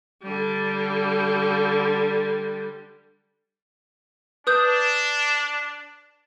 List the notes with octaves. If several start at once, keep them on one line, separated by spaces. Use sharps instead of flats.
D3 G3
D4 B4 D#6 G6